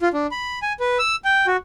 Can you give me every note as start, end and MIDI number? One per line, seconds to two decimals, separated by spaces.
0.01 0.09 65
0.14 0.27 62
0.31 0.59 83
0.62 0.73 80
0.80 0.98 71
0.99 1.16 88
1.25 1.46 79
1.47 1.57 66